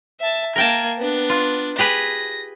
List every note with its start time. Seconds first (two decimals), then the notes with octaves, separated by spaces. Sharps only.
0.20 E5 A5
0.56 A#3 A#4 G5 A5 G#6
0.98 B3 D4
1.29 F4
1.78 G4 G#4 B4 A#6